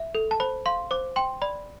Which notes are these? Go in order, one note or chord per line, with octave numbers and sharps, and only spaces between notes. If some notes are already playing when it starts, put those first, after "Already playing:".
Already playing: E5
A4
A5
C5 B5
F5 C6
C5 D6
G5 C6
D5 B5